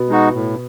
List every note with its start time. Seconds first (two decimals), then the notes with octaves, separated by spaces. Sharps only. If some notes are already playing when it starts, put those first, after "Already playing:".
Already playing: B2 B3
0.09 G#3 D#4 F#4
0.35 A2